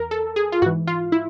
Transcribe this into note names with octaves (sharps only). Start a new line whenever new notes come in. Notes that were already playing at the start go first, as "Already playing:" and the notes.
Already playing: E2 A#4
A4
G#4
F4
G#2 E3 F#4
F4
E4